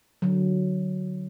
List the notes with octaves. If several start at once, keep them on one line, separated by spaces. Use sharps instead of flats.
D3 F#3